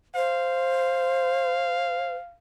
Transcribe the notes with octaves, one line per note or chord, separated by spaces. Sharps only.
C5 F5